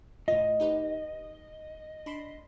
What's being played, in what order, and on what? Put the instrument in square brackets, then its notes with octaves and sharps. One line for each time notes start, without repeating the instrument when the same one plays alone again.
[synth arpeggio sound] A2 F4 [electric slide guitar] D#5
[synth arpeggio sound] D#4 G4 B4
D4 B5 C6